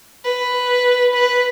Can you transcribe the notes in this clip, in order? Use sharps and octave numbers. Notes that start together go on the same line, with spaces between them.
B4
B4